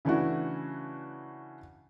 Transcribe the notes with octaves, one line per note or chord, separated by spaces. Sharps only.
C#3 E3 A3 D4 E4 F#4